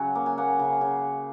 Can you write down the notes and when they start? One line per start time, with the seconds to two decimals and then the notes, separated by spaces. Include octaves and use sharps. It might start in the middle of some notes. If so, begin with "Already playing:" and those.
Already playing: C#3 F#3 F#5
0.15 A#3
0.26 G#5
0.37 A#3 F#5
0.59 C#3
0.81 C#3